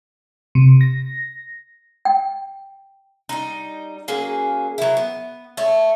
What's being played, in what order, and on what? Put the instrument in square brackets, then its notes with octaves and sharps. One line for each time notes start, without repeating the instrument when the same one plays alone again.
[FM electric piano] C3
A#6
[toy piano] G5
[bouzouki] G3 D#4
F#3 A#3 C#4 G#4
F#3 E4
B3
A3 C#5